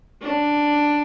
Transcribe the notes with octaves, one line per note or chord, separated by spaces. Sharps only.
D4